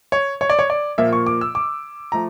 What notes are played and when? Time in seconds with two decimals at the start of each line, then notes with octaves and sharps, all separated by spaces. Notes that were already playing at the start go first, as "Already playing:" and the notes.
0.12 C#5
0.41 C#5
0.50 D5
0.59 C#5
0.70 D5
0.98 A#2 F3 A#3 E5
1.13 C#6
1.26 D6
1.41 E6
1.55 D6
2.12 F3 A3 A#5